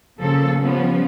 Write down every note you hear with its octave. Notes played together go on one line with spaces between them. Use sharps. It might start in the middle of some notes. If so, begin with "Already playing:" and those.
C#3 F3 A#3 A4
F3 G3 B3 C#4